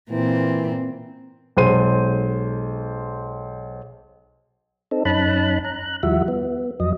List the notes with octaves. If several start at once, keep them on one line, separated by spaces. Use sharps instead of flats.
A#2 E3 C4
B1 F#3 G#3 C5 C6 D#7
C4 D#4 A4
F#2 C#4 D#4 A5 B5 F#6
A#5 F#6
D#2 F3 G3 E4 F#4 E5
B3
F2 F#3 D#5